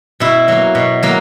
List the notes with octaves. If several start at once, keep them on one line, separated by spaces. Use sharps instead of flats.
B2 E4
F#3 A#3
B2
F#3 A#3